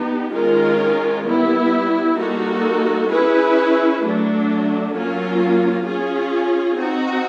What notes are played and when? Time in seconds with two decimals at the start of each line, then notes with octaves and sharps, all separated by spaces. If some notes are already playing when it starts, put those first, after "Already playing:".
Already playing: B3 D#4 G4
0.32 D#3 G#3 C#4 F4 A#4
1.24 G3 B3 E4
2.16 G3 A#3 D#4 F#4 A4
3.09 C#4 E4 G#4 B4
4.01 F#3 A3 D4
4.93 F#3 A#3 C#4 F4
5.86 C#4 F4 G#4
6.78 C4 D#4 F#4